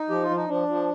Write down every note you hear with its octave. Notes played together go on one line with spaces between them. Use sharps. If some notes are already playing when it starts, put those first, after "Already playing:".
Already playing: D#4
F3 G4
F4
F3
D#4
F3 D4
F3